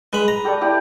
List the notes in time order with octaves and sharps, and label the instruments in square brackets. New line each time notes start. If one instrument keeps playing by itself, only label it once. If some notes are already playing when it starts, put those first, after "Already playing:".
[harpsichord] G#3 B5 [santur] B4
[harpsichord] A#5
[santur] G4 A4 D5
E4 G4 D5